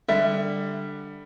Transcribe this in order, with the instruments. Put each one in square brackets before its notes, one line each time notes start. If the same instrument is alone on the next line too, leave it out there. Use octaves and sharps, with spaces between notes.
[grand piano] D3 G3 [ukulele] E5